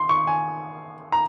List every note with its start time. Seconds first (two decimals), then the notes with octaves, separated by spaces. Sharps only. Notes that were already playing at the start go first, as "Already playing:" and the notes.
Already playing: C6
0.09 C#6
0.27 G#5
1.12 A#5